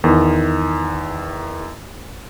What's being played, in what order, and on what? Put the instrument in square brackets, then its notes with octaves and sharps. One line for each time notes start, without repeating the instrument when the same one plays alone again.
[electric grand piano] E2 D#3